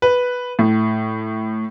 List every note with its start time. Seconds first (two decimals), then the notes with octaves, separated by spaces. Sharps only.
0.02 B4
0.59 A2